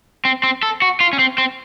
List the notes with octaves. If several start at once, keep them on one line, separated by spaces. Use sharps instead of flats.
C4
C4
A4
F#4
F4
C#4
C4
C4